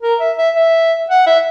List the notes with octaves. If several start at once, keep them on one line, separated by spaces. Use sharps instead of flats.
A#4
E5
E5
E5
F#5
E5